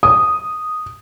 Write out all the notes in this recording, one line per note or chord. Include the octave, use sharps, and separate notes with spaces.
D#6